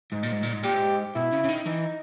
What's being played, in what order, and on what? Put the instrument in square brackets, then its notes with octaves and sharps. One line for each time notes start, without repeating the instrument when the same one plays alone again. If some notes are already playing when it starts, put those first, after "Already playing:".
[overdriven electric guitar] G#2 [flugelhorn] D#4
[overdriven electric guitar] A#2
G#2
A#2
G#2
[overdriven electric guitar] A#2 [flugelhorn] G4
[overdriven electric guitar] G#2
[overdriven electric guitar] B2 [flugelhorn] E4
[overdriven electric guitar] C#3
C#3
D#3
[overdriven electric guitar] E3 [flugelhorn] D#4